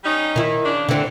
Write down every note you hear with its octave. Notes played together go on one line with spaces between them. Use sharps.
G3 C#4 D#4
D#3 E4
C#3 D4
A#2 D3 E3 C4